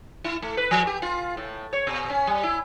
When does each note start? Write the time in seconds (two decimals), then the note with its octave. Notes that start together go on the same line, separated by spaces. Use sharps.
0.24 E4
0.42 A3
0.57 B4
0.71 F3
0.87 G4
1.02 F4
1.37 A2
1.73 C#5
1.87 B2
2.10 C#4
2.27 G3
2.43 E4